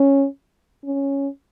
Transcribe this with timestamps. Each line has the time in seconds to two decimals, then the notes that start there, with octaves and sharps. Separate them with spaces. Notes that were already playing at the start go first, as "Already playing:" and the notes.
Already playing: C#4
0.85 C#4